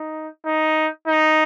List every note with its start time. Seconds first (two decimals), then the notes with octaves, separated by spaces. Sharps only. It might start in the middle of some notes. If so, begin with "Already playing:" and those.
Already playing: D#4
0.46 D#4
1.07 D#4